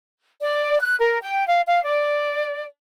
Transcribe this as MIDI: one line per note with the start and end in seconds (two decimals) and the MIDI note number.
0.41 0.80 74
0.80 0.95 90
0.99 1.18 70
1.21 1.46 79
1.47 1.60 77
1.66 1.82 77
1.84 2.64 74